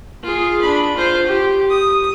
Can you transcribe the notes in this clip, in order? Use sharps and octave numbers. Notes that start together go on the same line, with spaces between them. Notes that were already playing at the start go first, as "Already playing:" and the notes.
F4 G#4
D4 B5
F4 C5
G4
D#6